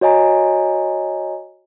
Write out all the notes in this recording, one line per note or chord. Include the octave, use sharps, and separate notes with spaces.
F#4 C#5 D#5 G#5 A#5